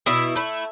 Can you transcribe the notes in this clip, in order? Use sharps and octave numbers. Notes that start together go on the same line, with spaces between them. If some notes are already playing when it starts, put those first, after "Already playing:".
B2 E4 E5
A3 E4